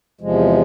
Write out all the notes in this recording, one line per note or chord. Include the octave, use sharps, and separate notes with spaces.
E2 C3 F3 G#3